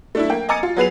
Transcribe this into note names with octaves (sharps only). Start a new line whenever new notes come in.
A3 D4 E4
A#3 G5
D#5 G#5 A#5 D6 A6 C#7
F4
F#3 B3 G#4 B4 C7 F7